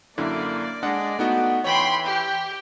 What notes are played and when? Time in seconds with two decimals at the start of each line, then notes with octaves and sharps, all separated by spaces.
0.18 F#2 D3 A#3 E4 D5
0.83 G#3 D4 D#5 F#5
1.19 A3 B3 D#4 F#4
1.64 E3 C#5 G5 B5 C6
2.04 G4 G5